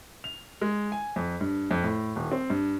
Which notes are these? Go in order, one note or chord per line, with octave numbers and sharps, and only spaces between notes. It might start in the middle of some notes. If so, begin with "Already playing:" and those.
F7
G#3
G#5
F2
G2
F2
A2
D#1
C4
G2